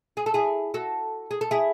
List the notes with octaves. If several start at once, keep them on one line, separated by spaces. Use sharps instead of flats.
G#4
A4
E4 G#4
F#4 A4
G#4
A4
E4 G#4